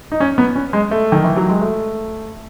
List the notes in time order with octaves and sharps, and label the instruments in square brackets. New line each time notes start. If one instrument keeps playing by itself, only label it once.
[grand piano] D#4
C#4
B3
C#4
G#3
A3
D#3
E3
F#3
G#3
A3